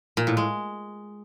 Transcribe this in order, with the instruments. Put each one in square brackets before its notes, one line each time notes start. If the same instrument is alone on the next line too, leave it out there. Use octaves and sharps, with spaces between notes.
[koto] A#2
A2
G#3